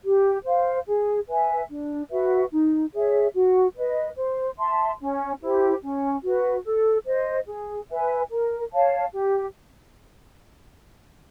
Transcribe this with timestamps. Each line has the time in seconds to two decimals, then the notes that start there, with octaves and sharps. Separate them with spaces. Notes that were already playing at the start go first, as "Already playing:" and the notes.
0.04 G4
0.45 C5 F5
0.87 G#4
1.29 B4 E5 G#5
1.70 D4
2.10 F#4 B4 E5
2.52 D#4
2.93 G#4 C#5 E5
3.35 F#4
3.76 B4 D#5
4.17 C5
4.58 E5 A5 C6
5.00 C#4
5.41 E4 G4 C5
5.83 C#4
6.24 F#4 B4
6.65 A4
7.06 C5 D#5
7.47 G#4
7.89 B4 E5 G#5
8.30 A#4
8.72 C#5 F5 A5
9.13 G4